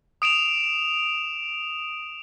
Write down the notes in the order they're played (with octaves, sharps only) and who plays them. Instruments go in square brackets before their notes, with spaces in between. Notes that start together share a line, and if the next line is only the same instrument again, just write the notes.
[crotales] D#6 D7 E7 F7